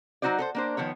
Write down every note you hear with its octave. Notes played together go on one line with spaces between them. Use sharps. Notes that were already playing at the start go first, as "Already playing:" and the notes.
F#3 G3 D#4 F#4 C5 D5
A4 B4 C5
A#3 D4 C5
D#3 F3 B3 C#5